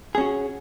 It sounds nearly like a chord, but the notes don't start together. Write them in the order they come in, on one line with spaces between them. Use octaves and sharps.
G#4 C#4 F#4